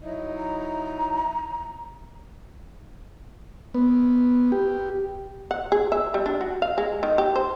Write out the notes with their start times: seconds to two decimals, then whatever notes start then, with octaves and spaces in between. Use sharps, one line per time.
0.01 F#3 D#4 E4 D#5
0.38 A#5
3.74 B3
4.52 G4
5.51 F#5
5.72 G#4
5.92 E5
6.14 G3
6.26 D4
6.41 F#4
6.62 F5
6.78 G#3
7.03 D#3
7.18 G4
7.36 C5